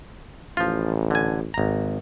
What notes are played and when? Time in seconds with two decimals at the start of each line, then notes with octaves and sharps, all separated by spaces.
0.57 A1 F3 F4
1.11 D3 G#5
1.54 G#1 A#5